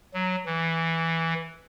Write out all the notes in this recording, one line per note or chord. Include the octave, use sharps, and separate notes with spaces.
F#3
E3